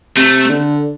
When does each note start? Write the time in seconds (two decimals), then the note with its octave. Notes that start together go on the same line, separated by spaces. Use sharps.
0.16 C3 A3
0.50 D3